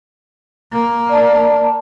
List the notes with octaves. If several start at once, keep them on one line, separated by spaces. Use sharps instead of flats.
A#3
D5 A5